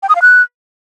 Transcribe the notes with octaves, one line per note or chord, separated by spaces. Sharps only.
G5
D#6
F5
F#6